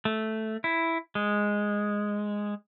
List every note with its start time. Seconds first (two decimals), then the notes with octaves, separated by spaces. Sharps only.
0.05 A3
0.64 E4
1.15 G#3